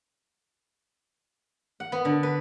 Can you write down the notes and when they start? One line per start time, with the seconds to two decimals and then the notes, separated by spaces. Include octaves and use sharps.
1.80 F#5
1.92 B3
2.05 D3
2.23 B4